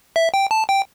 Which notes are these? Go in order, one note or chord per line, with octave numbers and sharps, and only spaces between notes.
E5
G5
A5
G5